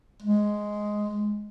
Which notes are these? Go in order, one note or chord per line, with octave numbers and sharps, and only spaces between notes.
G#3